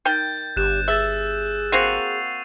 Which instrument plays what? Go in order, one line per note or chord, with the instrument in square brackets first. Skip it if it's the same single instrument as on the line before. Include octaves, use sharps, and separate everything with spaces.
[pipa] D#3 G5 [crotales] G6 A6
[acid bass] G1 [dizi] G4 [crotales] F#6 E7
[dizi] G#4 [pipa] E5 [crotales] E6 A6
[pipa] A#3 C4 F#4 [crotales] C7 D#7 F7